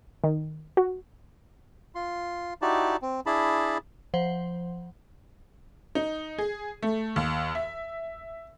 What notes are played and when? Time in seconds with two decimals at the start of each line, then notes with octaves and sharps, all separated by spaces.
0.24 D#3
0.77 F#4
1.95 F4 C6
2.62 D#4 E4 F#4 G4 D5 A5
3.02 C4
3.26 D4 E4 G#4 A5 B5
4.14 F3 C5 F#5
5.95 D#4
6.38 G#4
6.83 A3
7.16 D#2
7.55 E5